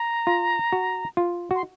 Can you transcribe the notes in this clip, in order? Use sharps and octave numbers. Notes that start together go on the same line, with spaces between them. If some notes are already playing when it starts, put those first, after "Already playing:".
Already playing: A#5
F4
F#4
F4
F#4 C6